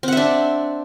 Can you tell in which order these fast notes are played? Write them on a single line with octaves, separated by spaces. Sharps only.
C4 F#5 E5 D4